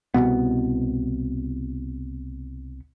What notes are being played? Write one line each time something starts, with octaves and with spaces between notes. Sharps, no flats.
C2 F#2 B2 B3